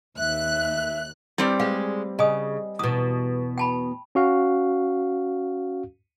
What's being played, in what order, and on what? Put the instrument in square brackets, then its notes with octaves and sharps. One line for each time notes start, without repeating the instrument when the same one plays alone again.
[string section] D#2 F#6 [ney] E5
[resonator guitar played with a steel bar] G3 C4 D5 [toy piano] E4 B4
[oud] G#3 [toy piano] B4 F5
[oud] C#3 [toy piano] D#5 G#5 D#6
[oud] E2 B2 [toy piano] D#6
[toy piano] G5 A5 B5
[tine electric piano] C#4 F#4 F5